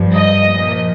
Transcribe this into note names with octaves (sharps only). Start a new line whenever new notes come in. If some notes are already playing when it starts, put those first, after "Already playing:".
Already playing: G2 F3
D#5
A#2 F3